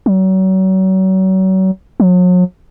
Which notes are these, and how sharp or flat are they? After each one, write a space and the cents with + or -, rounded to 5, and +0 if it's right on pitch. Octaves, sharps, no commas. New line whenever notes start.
F#3 +35
F#3 -40